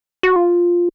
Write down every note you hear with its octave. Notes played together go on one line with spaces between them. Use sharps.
F#4
F4